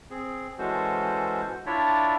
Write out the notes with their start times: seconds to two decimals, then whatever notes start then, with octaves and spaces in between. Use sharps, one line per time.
0.11 C4 G#4
0.58 E3 G#3 C#4 F#4 A4 C5
1.66 D4 E4 F4 C#5 D5 E5